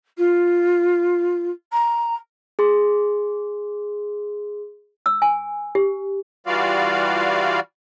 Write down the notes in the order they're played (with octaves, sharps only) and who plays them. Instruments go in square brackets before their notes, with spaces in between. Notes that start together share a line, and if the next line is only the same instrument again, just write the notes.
[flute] F4
A#5
[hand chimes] G#4 C6
[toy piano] E6
G#5
G4
[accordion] E3 G3 F4 F#4 D5 F5